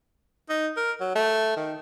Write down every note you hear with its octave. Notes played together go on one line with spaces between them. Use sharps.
D#4
A#4
F#3
A3
D#3